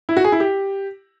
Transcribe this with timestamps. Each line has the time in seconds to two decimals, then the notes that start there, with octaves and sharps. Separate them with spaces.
0.09 E4
0.17 F#4
0.24 G#4
0.32 E4
0.40 G4